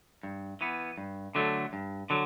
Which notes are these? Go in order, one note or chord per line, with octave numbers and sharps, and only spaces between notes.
G2
E3 B3
G2
D3 F#3 A3
G2
D3 F#3